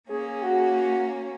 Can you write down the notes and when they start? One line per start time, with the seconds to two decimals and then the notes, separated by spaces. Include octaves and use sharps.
0.08 A#3 C#4 G#4
0.43 F#4